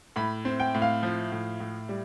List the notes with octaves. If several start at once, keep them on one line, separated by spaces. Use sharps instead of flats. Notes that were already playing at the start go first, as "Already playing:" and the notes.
A2 B5
C4
G5
A2
F5
F3
A2
A2
G3